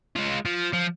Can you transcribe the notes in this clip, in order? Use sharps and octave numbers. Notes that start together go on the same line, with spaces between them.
G#3 F4
F3
F3